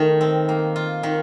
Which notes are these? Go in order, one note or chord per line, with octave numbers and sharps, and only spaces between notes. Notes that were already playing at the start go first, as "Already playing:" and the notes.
Already playing: D#3 A3
C4
A#3
F4
D#3